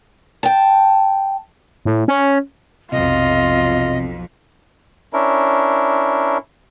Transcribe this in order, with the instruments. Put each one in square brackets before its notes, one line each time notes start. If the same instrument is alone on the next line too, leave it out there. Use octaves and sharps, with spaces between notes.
[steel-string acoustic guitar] G5 A5
[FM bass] A2
C#4
[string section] B1 F2 F3 [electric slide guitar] C3 [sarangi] F4 [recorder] D#5
[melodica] C#4 D4 E4 A#4